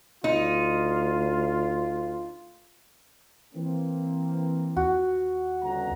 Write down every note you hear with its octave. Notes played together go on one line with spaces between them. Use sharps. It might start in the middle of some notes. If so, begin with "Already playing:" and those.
D2 D#4 F4
E3 A#3 C4
D#2 F#4
G1 C#3 A#5